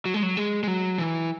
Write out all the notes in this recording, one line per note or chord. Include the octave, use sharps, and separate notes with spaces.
F#3
G#3
F#3
G#3
G#3
F#3
E3